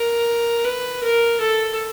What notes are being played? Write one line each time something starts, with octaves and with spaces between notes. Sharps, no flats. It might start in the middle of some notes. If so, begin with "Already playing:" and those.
Already playing: A#4
B4
A#4
A4